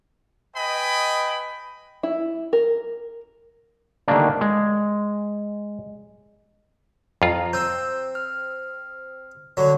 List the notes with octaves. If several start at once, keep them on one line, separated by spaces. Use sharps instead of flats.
B4 D#5 G5 G#5 B5
E4
A#4
D3 D#3 G3 A3 A#3 D4
G#3
F2 F4 A#5
C4 E6 G6
F6
D3 F#3 C#5